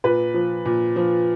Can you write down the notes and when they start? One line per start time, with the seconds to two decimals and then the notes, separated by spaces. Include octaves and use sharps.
0.04 A#2 B4
0.34 F3
0.65 A#2
0.96 F3